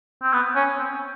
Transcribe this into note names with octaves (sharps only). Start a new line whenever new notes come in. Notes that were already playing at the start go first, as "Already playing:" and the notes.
C4
B3
C#4
C4